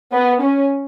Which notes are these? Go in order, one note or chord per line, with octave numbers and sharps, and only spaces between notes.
B3
C#4